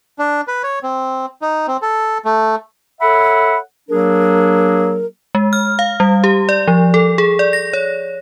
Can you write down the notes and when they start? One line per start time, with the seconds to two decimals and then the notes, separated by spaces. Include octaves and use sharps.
0.19 D4
0.48 B4
0.63 C#5
0.83 C4
1.42 D#4
1.67 C4
1.82 A4
2.25 A3
3.01 A4 C#5 E5 F#5 B5
3.89 F#3 A#3 D4 G#4 A#4
5.35 G#3
5.53 F6
5.79 F5
6.00 G3
6.24 G4
6.49 D5
6.68 F3
6.94 A4
7.18 G#4
7.39 D5
7.53 A#6
7.73 C#5